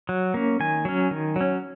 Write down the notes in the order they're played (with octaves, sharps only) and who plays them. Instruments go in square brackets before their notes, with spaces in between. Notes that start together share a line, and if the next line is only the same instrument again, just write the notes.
[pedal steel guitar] F#3
A#3 C#4
D#3 G#5
F#3 C#4
D#3
F#3 C#4